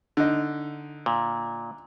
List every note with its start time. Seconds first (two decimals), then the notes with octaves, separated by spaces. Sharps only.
0.17 D3 D#4
1.06 A#2